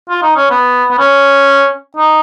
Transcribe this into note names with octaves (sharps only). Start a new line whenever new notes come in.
F4
D#4
C#4
B3
B3
C#4
D#4